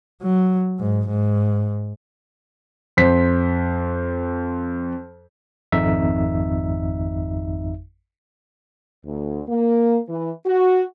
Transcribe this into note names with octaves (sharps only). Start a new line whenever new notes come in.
F#3
G#2
G#2
F2 C5 B6
G#1 F2 D#4 E5
D2
A#3
E3
F#4